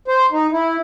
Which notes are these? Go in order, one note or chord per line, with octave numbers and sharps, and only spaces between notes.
C5
D#4
E4